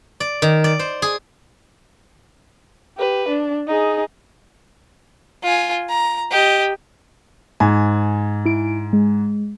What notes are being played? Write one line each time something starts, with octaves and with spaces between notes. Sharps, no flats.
D5
D#3
D5
C5
G#4
G4 B4
D4
D#4 G#4
F4 G#5
A#5
G4 D#5
G#2 G#5
E4 D7
G#3